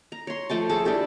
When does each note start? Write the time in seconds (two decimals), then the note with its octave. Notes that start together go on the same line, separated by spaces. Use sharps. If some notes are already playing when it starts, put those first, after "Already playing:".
0.12 A#5
0.27 C#5 C6
0.49 F3 A3 G5 A5
0.69 G#4 A4 A5
0.85 D4 E4 G4 A4